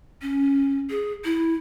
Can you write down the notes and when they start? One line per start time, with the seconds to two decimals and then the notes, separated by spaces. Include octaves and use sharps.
0.22 C#4
0.90 G#4
1.25 E4